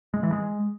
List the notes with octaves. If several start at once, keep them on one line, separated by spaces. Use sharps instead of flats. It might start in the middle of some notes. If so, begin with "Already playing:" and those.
G#3
E3
G#3